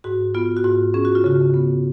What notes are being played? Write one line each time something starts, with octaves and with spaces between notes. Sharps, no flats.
G#2 F#4
B3 F4
F#4
G#2 F4
C#4 G#4
F#4
F4
C#3 F#4
B3